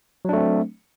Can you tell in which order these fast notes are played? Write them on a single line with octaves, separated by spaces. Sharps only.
F#3 D4 A3 C4